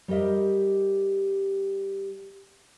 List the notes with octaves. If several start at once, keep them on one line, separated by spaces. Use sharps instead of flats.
G3 G4 A#4 D#5 E5